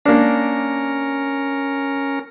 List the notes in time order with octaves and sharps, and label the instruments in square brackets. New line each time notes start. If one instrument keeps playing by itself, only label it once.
[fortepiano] A#3 D4 [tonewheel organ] C#4 A#4